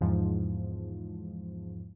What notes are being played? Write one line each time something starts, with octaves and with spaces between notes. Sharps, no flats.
E2 G#2 F3